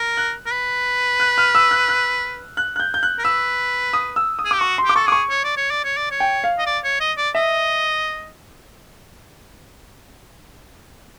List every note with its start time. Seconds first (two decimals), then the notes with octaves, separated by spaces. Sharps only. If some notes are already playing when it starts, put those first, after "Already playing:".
Already playing: A#4
0.17 F#6
0.46 A#4
0.52 B4
1.20 F#6
1.38 F6
1.55 E6
1.71 F#6
1.88 F#6
2.57 F#6
2.76 F#6
2.80 G6
2.94 G6
3.03 F#6
3.19 A#4
3.24 B4 E6
3.93 D#6
4.16 E6
4.39 D#6
4.45 G#4
4.51 G4 D6
4.61 F#4 C#6
4.78 C6
4.85 G4 D6
4.96 A4 C#6
5.06 G#4 D6
5.12 C#6
5.30 C#5
5.44 D5
5.57 C#5
5.71 D5
5.84 C#5
5.97 D5
6.11 C#5
6.20 G5
6.44 F5
6.58 D#5
6.66 D5
6.84 C#5
7.00 D#5
7.18 D5
7.35 D#5 E5